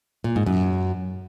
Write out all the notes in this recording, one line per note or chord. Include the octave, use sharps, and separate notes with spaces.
A#2
G#2
F#2